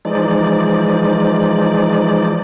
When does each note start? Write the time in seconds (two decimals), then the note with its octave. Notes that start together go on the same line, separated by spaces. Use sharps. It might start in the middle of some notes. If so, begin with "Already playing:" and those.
0.05 E3 F3 G#3 D#4 D5